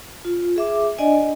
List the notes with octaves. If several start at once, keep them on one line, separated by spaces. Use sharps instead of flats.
F4
G#4 E5 D6
D4 D5 D#5 G#5